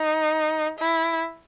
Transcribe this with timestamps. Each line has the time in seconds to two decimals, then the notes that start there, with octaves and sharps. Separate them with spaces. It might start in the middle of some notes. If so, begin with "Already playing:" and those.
Already playing: D#4
0.79 E4